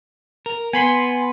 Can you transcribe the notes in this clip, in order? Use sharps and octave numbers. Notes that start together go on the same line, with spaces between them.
A#4
B3 G#5 B5 C6